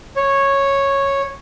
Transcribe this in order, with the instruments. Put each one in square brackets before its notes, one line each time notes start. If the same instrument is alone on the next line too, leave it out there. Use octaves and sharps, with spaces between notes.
[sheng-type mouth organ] C#5